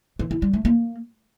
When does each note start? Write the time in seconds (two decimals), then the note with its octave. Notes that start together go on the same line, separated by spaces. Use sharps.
0.19 E3
0.31 E4
0.42 G3
0.53 A3
0.65 A#3